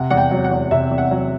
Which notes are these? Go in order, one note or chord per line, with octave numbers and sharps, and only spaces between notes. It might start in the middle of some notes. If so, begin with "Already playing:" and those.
Already playing: C3 F#5
E2 F#5
G5
F#3
F#5
E2
C3 E5
E2
F#5
F#3